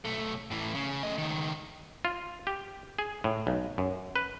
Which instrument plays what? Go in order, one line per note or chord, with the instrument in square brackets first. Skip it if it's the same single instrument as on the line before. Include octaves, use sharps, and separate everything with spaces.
[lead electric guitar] B1 A3
A2 E3
C#3
A3 D#5
C#2 D#3
[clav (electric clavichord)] F4
G4
G#4
A2
B1
F#2
B4